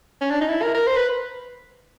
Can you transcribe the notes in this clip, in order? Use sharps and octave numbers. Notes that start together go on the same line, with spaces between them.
C#4
D4
D#4
E4
A#4
A#4
C5
B4